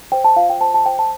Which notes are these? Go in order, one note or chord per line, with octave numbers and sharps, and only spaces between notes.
C5 G5
A5
F4 F5
G5
C5 A5
A5
C5 G5
A5